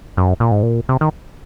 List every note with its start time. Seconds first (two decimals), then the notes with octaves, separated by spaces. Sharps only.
0.17 F#2
0.40 A#2
0.51 G#2
0.63 A#2
0.89 C3
1.01 D#3